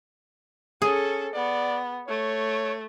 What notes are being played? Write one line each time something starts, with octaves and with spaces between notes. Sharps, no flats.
C#4 G#4 A4
B3 D5
A3 C#5